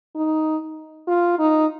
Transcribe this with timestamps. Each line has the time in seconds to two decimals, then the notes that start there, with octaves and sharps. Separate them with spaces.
0.15 D#4
1.08 F4
1.39 D#4